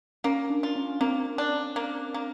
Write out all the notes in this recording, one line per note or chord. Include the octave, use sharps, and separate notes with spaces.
A#3 C#4
D4
F4
C#4
A#3 C4
D4
A#3
A#3